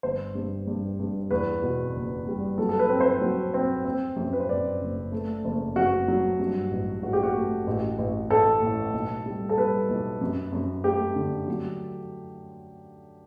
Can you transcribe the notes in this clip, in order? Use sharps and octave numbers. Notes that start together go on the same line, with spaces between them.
G1 C5
G2
G2
G2
E2 B4
B2
F#1
G3
F#3 A4
A4
B4
C4
C5
F#3
C4
C4
F#2
B4
C5
F#2 D5
F#1
A3
F#1
F#2 F#4
F#3
G2
A1
A1 F#4
G4
F#4
A3
A1
A1
A1 A4
A2
B1
G3
A4
G3 B4
B1
F#2
F#2
A3 G4
D3
F#3